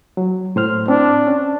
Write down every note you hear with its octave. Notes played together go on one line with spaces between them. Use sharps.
F#3
A2 C5 F6
C4 D4
C#4